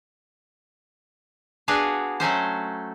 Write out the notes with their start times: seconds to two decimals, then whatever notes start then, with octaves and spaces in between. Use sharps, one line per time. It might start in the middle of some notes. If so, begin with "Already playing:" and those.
1.68 B3 D4 F#4 G#4 F5
2.20 F#3 A3 C#4 C5